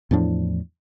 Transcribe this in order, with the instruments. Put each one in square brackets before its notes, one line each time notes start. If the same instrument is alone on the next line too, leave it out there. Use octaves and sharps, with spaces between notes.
[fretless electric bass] E2 A2 F3 D4